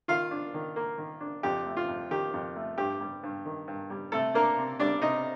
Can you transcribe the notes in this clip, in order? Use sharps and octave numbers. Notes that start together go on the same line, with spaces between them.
D#3 F4 F5
D4
D#3
A#3
D#3
D4
F2 G4
A3
F4
F2
D#3 G4
F2
A3
G2 G4
G3
G2
D#3
G2
G3
C3 A3 A4
A#3 D4 A#4
C3
G3 D4 D5
C3 D#4 D#5